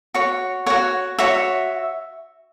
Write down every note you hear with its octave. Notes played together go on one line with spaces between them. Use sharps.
F#4 C#5
F#4 C#5 F#5
F#4 C#5 E5